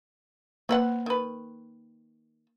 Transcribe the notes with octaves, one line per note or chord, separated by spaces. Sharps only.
A#3 C4 B4 F#5
D#3 B4